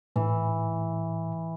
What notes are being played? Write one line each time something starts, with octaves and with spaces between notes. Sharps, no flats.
A2 E3